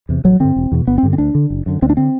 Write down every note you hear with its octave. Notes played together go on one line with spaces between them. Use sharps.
E2 C3
A1 F#3
G2 D3 C4
E1
E2 B2
G1 B3
C4
G2 D3
C4
D2 D4
D3
F#1
F#2 D3
D2 C4
D4
D3 C4